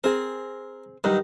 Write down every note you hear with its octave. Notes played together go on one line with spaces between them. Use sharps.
C4 G#4 A#4
G2 D#3 F#3 D#4